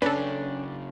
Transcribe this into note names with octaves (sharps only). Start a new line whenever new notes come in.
F#2 C#3 C#4 D4 A4 B4